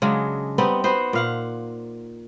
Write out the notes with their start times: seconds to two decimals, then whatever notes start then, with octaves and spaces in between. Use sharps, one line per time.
0.02 C#3 F#3 G#3 D4
0.58 G3 B3 C4 D#4
0.84 B3 F#4 C5
1.13 A#2 F5 F#5